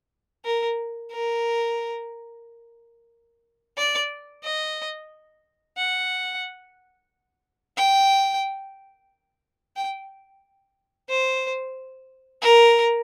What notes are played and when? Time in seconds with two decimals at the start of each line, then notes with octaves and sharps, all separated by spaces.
0.45 A#4
1.11 A#4
3.77 D5
4.44 D#5
5.77 F#5
7.77 G5
9.76 G5
11.09 C5
12.42 A#4